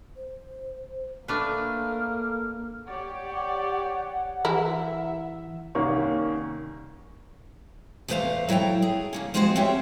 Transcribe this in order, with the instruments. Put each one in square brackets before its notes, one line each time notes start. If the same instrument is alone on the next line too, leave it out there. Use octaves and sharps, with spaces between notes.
[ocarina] C5
[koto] A3 D4 B4 [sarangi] A#3 [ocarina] A4 [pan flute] F6
[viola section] G4 C#5 D5 [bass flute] F#5
[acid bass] E3 [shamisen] E4 A#4 [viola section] E5
[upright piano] C2 D#3 A#3 C#4 C#6
[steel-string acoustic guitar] E2 A#2 A3 C5 F5 A#5
F#3 E4 A4 G5 A#5
G#4
C#3 A#3 C#4
F3 G#3 C4 F#4 G#4 C5
C4 C#4 G4 C#5 E5